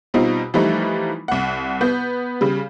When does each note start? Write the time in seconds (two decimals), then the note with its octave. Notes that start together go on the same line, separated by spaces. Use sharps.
0.14 B2 G3 C4 D#4 F4
0.54 E3 F3 G3 A3 D#4
1.28 C2 F#5
1.81 B3 G6
2.41 C#3 G3